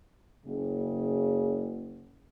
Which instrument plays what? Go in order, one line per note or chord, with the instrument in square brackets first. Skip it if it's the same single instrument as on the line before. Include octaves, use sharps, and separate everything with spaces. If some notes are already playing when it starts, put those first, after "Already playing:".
[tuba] F#1 [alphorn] C#3